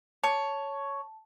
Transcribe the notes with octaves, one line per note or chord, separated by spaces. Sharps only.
C#5 A5